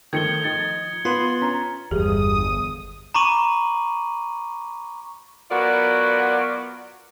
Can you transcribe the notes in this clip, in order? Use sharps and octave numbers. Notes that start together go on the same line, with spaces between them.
D#3 F3 A3 G#6 C#7 G7
F3 D#4 A6 C#7
B3 F4 B4 C6
C#4 A#5
G1 E2 G3 G4 G#4 D#6
A#5 B5 C#6 D6 D#7 F#7
F#3 B3 F4 F#4 A#4 D5